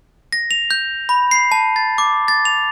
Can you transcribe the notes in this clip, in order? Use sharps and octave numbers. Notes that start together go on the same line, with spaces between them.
A#6
F7
G6
B5
C7
A5
A6
D6
A6
F7